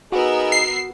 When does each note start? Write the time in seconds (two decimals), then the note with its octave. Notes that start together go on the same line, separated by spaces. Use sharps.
0.12 B3 D#4 F#4 G#4 A#4 E6
0.52 C7